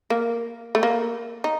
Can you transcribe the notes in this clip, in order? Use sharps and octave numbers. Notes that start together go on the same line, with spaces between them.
A#3
A3
A#3
D#4